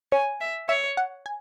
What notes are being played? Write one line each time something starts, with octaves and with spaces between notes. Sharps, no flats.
C#5 G#5
E5
C#5 E5
F#5
G#5